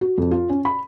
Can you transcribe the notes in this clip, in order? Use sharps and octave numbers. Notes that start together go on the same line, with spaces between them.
F#4
F2
F4
C#4
B5